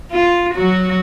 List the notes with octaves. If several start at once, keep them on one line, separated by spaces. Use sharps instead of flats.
F4
F#3 F#4